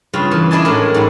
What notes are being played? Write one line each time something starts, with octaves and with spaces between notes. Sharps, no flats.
G2 C#3 F4
E3
D4 E4 D#5 G#5 A5
A2 G#3 C#4 A#4
G#2 G3